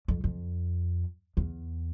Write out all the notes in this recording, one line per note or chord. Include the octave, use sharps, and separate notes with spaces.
F2
F2
E2